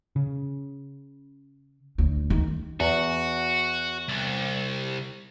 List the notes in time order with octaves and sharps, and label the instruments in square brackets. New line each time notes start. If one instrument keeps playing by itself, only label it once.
[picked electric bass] C#3
[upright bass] D2
D#3
[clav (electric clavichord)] E2 [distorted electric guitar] F#4
[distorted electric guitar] C2